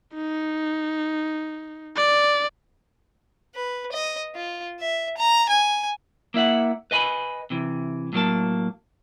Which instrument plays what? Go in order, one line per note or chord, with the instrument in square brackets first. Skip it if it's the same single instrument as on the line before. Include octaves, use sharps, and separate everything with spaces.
[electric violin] D#4
D5
[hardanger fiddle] B4
D#5
F4
E5
A#5
G#5
[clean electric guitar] A#3 E4 E5 F#5
B4 D#5 G#5 B5
C3 E3
A2 F#3 A#3 A5